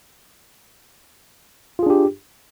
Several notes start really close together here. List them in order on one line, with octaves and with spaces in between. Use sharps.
F4 G#4 D4 G4